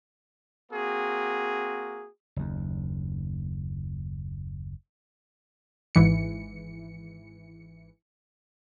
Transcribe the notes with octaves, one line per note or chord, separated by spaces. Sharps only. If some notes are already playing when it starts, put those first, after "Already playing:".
A#3 C4 F#4 G#4
F#1 D#2
G#1 G#2 E3 C#7